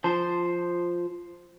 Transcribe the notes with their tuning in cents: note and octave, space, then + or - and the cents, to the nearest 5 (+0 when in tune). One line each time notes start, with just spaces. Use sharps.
F3 +0 C5 +0 A5 +0